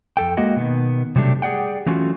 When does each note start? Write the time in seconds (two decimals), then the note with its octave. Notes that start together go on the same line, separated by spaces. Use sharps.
0.17 F2 A4 G5
0.37 G#3 A#3 F#4 D#5 F#5
0.56 B2 D#3 B3
1.16 C3 F#3 G3 A3 D4 G4
1.42 G4 G#4 D5 F#5 G5
1.86 E3 F#3 A3 C#4 F4 F#4